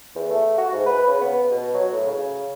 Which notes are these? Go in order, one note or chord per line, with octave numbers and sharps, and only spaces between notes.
E2
A3
F#4
G#2
B4
C#3
B3
B2
F#3
A2
C#3